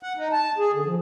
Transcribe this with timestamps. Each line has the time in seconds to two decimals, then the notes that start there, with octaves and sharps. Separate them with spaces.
0.03 F#5
0.17 D#4
0.33 A5
0.58 G#4
0.73 D3
0.86 F3